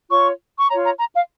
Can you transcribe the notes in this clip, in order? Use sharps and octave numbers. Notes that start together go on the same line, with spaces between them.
F4 C#5 C#6
C#6
F4 C#5 A#5
A#5
A#5
F5